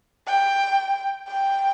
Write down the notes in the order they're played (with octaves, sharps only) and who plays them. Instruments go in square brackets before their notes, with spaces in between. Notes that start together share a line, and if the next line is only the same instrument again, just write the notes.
[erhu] G5
G5